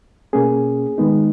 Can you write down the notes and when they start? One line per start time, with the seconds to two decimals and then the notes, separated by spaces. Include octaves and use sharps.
0.33 B2 A#3 C#4 G#4
0.98 D#3 G#3 B3 D#4